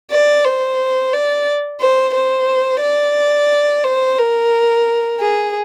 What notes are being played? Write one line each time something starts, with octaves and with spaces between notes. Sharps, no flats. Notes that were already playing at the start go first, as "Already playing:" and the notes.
D5
C5
D5
C5
C5
D5
C5
A#4
G#4